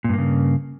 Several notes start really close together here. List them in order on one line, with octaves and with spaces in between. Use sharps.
A#2 G2 A#3 C#3